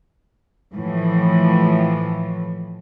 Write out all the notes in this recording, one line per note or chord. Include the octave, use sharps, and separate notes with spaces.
A2 E3 F3